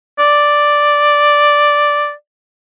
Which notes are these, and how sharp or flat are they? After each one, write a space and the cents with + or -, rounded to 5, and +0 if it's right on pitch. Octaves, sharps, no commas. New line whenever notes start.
D5 +0